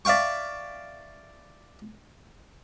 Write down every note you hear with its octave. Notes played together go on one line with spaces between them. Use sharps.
D5 E5 F5 G5 C#6